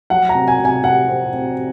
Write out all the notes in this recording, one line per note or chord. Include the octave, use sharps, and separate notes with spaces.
F#3 F#5
A#5
C3
G#5
C3
G#5
C3 F#5
C4
C3